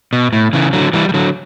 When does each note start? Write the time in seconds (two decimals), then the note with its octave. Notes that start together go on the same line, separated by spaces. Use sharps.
0.13 B2
0.33 A2
0.53 C#3 E3
0.73 D3 F#3
0.93 E3 G3
1.09 G3
1.14 D3 F#3